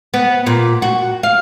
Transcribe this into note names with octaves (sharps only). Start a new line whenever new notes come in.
B3
A#2
F#4
F5